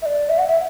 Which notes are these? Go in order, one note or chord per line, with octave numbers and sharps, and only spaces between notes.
E5
D5
E5
F#5
E5